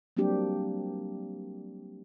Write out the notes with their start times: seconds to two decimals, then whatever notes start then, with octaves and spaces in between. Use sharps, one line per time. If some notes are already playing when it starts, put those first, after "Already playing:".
0.17 F#3 G3 A#3 C4 D4 G4